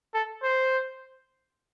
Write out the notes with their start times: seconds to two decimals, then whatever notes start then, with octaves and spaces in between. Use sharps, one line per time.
0.14 A4
0.43 C5